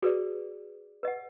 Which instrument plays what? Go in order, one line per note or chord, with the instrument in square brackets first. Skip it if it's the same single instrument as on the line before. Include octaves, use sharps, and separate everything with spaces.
[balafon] F#4 [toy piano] G#4 B4 D5
[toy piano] B4 D#5 F#5